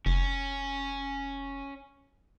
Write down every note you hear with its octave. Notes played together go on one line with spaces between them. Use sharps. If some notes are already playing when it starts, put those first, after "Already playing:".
F1 C#4